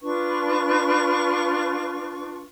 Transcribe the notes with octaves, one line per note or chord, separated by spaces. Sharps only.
D4 F4 B4 C#6